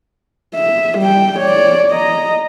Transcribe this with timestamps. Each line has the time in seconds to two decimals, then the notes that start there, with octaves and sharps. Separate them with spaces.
0.55 E5
0.99 G3 G5
1.39 C#5 D5
1.91 D#5 A#5